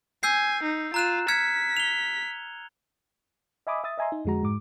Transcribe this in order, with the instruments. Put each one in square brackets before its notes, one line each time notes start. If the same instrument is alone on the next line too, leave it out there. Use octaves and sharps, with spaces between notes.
[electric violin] G#5 [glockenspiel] E6 G6 C7
[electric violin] D#4
[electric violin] F4 [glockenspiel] A#5 F#6 E7
[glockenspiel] F6 G#6 C#7 [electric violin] B6
[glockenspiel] F7 G7
[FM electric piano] D#5 E5 G#5 B5 D6 D#6
E5 D#6 A6
D#5 E5 G#5 A#5 C6
D#4
F2 D3 G#3 F#4 A#5
G#2 D6